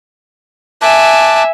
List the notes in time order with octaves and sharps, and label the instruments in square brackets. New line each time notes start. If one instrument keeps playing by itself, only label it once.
[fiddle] E5 G#5 [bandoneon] A5 D6 F#6